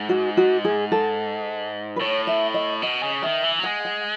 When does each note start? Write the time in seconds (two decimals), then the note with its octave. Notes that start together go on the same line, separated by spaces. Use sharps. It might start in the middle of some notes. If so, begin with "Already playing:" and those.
Already playing: G#2
0.09 F#4
0.37 F#4
0.65 G#4
0.92 A4
1.96 B4
2.00 A2 C#5
2.27 E5
2.54 D#5
2.82 B2 D#5
3.03 C#3
3.22 D#3 E5
3.44 E3
3.59 F#3
3.63 G#3 F#5
3.85 F#5